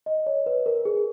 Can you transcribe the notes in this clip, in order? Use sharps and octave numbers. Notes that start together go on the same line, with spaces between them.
D#5
C#5
B4
A#4
G#4